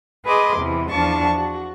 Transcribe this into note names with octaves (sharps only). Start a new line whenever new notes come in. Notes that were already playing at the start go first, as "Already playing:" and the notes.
G#4 B4 D#5 C6 D6
E2 C3 E3
E2 F3 D4 F4 A5 C#6
F#4